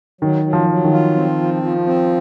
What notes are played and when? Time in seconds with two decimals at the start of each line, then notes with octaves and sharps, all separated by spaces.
0.21 D#3 F#3
0.44 F#3
0.53 F3
0.69 F#3
0.84 D#3
0.92 F4
1.15 C4
1.38 F3
1.63 F3
1.86 C4